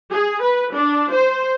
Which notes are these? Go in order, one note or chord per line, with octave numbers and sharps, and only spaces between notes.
G#4
B4
D4
C5